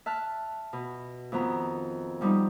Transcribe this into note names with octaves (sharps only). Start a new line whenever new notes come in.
E5 A5 F6 F#6
B2
F2 D#3 B3 A#5
F3 G3 B3 D#4